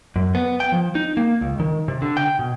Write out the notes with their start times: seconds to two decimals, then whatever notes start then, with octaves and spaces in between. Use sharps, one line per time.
0.16 F#2
0.35 B3
0.60 G5
0.72 F3
0.95 D#4
1.17 A#3
1.41 C#2
1.60 D#3
1.88 C3
2.02 D3
2.17 G5
2.39 B2